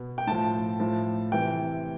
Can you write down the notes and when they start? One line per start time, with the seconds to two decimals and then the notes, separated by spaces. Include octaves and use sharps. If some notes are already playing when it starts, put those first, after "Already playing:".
Already playing: B2
0.18 G5
0.27 A2 F3 A5
0.80 A2 F3
1.32 C3 E3 G5